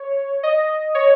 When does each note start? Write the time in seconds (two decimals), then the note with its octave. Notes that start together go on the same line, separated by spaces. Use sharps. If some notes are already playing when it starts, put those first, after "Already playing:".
Already playing: C#5
0.43 D#5
0.95 C#5